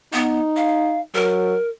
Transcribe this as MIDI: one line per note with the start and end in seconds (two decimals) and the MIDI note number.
0.13 0.39 59
0.13 1.01 63
0.56 1.00 77
1.15 1.55 54
1.15 1.69 70